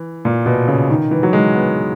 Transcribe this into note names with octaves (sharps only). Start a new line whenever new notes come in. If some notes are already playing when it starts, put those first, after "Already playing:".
Already playing: E3
A#2
B2
C#3
D#3
E3
F#3
G#3
B3